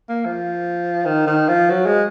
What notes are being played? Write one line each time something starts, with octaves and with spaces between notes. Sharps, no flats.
A#3
F3
D#3
D#3
F3
F#3
G#3